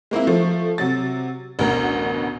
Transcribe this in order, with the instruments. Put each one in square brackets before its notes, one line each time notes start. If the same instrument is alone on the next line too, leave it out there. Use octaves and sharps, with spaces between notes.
[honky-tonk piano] G#3 A#3 C4 E4
F3 A3
C3 F#3 A6
A1 D2 B2 A#4